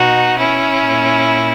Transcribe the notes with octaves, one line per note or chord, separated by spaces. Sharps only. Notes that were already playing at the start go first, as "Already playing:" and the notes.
Already playing: B2 D#4 F#4
C#4 E4
A#2